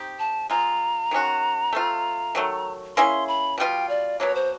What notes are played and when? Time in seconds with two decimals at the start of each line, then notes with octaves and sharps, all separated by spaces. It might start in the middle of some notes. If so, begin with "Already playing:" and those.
Already playing: C4 D#4 G4
0.19 A5
0.50 G#3 C4 F4 A#5
1.11 D#3 G#3 C#4 F#4
1.73 A3 C4 F4
2.35 D#3 F#3 A3
2.96 A#3 C#4 E4 G#4 C6
3.28 B5
3.58 B2 G3 C4 F4 G5
3.89 D5
4.20 B2 F#3 A#3 C#5
4.35 C5